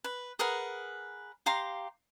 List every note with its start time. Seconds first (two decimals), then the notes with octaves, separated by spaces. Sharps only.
0.04 B4
0.39 G#4 A#4 B4 F#5
1.46 G4 F5 A#5 C6